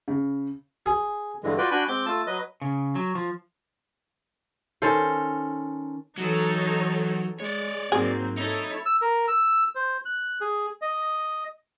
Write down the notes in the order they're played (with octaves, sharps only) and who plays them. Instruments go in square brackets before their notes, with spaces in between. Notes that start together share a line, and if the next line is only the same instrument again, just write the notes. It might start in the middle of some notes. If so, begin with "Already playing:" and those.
[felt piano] C#3
[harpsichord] G#4
[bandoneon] G2 D3 E3 G#3
F4 F#4 B4 D5 G5
D4 F#4 G5 G#5 B5
G#3 C4 D6 G6
A3 F4 A5 E6
F#3 B4 D#5
[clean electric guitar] C#3
F#3
F3
[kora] D#3 C#4 A4 C5
[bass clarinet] E3 [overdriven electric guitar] F#3 [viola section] D#4 A4 C#5
[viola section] G#3 [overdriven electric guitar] C#5 D5
[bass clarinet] G#2 [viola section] F#3 A#3 C4 [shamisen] G#4
[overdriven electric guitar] D#4 D#5 [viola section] E4 A4 C#5
[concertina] E6
A#4
E6
C5
F#6
G#4
D#5